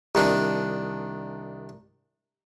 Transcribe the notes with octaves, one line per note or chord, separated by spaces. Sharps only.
C2 D#3 D4